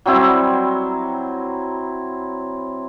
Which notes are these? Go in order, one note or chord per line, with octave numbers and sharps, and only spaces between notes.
F#3 G3 C4 E4